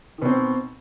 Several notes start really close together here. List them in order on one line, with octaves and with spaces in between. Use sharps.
D#3 B2 C4